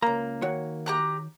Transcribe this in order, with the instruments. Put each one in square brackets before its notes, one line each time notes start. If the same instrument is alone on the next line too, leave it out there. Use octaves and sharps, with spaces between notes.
[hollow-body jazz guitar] C#2 A#5 [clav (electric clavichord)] A#3
[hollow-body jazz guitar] D#3 F#4 C#5
[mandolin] G4 A#5 F#6